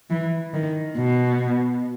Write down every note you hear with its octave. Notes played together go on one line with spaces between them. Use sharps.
E3
D#3
B2